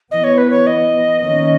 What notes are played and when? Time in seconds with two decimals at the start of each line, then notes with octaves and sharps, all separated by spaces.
0.11 E3 B3 D#5
0.24 C#5
0.38 B4
0.50 C#5
0.67 D#5
1.22 D#3 A#3 C#4